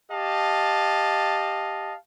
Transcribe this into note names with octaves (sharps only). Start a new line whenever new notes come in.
G4 D#5 F5 A5